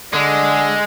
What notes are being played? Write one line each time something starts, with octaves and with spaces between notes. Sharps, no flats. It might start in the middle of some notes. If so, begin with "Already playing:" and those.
D3 G#3